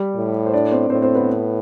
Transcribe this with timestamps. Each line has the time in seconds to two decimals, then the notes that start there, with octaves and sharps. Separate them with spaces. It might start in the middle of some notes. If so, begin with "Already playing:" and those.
Already playing: G3 G4
0.16 A2
0.46 C5
0.53 D4 D5
0.72 C4 C5
0.90 A2 C4 C5
1.02 C4 C5
1.15 B3 B4